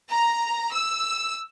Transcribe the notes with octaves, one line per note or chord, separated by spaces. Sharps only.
A#5
E6